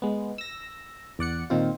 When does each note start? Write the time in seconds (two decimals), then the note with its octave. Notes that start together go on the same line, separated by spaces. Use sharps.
0.02 G#3 B3
0.38 E6 A#6
1.19 E2 D5 F#5 C#7
1.50 A#2 D#3 C4 F4